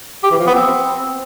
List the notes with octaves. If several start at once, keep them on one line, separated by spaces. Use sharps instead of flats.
G4
E3
F3
B3
C4